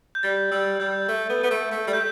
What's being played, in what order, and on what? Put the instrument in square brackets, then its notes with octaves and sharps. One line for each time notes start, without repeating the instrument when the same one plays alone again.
[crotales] G6
[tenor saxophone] G3 [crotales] A6
[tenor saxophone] G3 [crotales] E6
[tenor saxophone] G3 [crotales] G6
[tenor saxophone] A3
B3
B3
A3
A3
G3
[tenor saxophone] A3 [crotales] G6